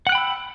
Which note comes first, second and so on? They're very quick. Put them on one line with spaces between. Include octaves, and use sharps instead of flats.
F#5 F#6 G5 B5 E6